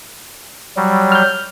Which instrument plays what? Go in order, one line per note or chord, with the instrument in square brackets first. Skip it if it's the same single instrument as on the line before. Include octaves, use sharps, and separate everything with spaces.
[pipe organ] F#3 G3
[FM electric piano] F6 G6